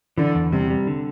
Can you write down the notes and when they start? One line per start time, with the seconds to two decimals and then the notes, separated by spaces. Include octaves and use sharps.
0.18 D3 E3
0.35 E2
0.52 C3 G3
0.70 G3
0.87 D3